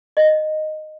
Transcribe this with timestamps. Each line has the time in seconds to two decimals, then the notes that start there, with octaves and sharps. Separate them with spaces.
0.17 D#5